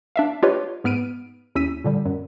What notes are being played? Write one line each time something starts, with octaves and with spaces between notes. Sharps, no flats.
D4 E5 F5
D4 F4 G4 B4 C#5 D#5
G#2 B3 F6 D7 D#7
D#2 C#4 E4 E6 B6 D#7
A#2 D3 G3
F#2